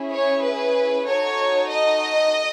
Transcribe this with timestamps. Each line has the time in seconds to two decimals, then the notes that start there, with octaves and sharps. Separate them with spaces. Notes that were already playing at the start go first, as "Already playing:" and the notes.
Already playing: C#4 E4 G#4
0.12 C#5
0.44 B4
1.07 D#4 F#4 A4 C#5
1.72 D#5